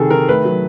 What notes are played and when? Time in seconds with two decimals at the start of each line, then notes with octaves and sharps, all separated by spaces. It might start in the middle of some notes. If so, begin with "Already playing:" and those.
Already playing: C3 D#3 G#4 A4
0.10 D#3 A#4
0.29 A3 B4
0.45 F#3